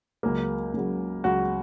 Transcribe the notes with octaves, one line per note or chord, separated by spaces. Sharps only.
C#2 C#3 F#3 A#3
C#2 C#3 F#3
C#2 C#3 F#3 F#4